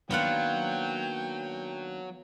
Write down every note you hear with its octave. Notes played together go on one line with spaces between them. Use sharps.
D#3 F#3 A#3 B3 D4 F4 F#5 G5